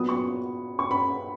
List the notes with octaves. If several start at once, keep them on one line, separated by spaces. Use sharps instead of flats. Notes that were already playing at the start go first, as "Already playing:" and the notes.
Already playing: A#2 F#3 B3 D#6
C#6
C#6
B5